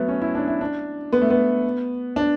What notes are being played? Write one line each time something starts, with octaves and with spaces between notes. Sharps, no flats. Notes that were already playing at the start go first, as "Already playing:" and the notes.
Already playing: F#3 A3 B3
C#4
E4
D4
E4
D4
B3
A3
B3
D4